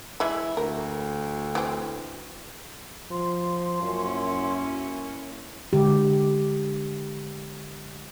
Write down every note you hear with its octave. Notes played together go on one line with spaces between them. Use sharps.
E3 G#3 E4
D2 A#4
E3 C4
F3 C6
F#2 A#3 C#4 E4
D3 G#3 G4